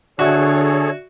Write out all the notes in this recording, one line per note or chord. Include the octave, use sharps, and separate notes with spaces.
D3 F#4 G#4 A4 C#5 D5 E5